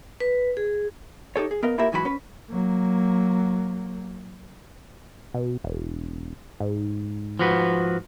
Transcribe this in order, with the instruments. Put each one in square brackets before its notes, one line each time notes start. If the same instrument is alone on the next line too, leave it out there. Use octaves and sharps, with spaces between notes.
[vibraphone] B4
G#4
[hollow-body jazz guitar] D#4 G4 A4 C#5
G#4
B3 A#4 D#5 F5
A#3 E4 F4 G4 A#4 E5
G#2 E3 F#3 F#4 A#4 B5
C#4 B4
[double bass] F#3 A#3
[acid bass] B2
E1
G#2
[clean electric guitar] F3 F#4 B4